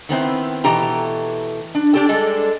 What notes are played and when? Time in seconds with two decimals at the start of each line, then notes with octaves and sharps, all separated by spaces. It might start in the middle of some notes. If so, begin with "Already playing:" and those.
0.09 D#3 B3 C4 E4
0.64 B2 E3 A3 G4 A#5
1.75 D4
1.94 D4 G4 A4
2.09 G3 G#3 D4 A4